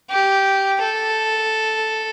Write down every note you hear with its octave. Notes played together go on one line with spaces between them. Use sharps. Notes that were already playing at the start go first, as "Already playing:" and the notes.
G4
A4